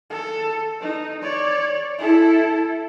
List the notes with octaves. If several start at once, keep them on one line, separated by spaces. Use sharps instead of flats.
A4
D#4
C#5 D5
E4 A4